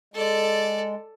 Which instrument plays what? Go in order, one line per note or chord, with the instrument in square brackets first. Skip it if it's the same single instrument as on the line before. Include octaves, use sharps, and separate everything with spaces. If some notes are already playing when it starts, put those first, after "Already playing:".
[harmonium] G#3 [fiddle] A4 D5